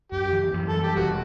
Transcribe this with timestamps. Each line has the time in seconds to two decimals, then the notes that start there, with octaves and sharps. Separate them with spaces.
0.12 F#2 G4
0.33 E3
0.53 F#2
0.69 A4
0.75 G3
0.83 G4
0.96 E1 F#4